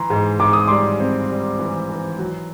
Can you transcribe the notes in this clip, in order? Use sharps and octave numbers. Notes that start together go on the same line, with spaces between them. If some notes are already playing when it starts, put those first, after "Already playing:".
Already playing: E3 A#5 C6
G#2
G#2 D6
D#6
G3 C6 D6
C4
G3
E3
E3
F#3